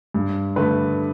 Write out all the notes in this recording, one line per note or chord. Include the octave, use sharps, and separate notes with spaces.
G2
D3 A3 B4